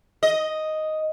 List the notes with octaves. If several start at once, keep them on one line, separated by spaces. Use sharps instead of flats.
D#5